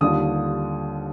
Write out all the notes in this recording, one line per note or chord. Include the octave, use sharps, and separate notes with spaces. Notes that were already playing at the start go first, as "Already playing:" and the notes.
D#2 D3 G3 D4 F4 D#6